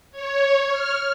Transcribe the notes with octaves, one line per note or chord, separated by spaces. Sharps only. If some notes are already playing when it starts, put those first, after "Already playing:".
C#5
F6